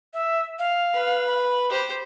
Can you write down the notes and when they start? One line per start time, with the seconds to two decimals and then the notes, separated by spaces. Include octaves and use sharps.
0.14 E5
0.59 F5
0.94 B4
1.27 B5
1.70 G4 C5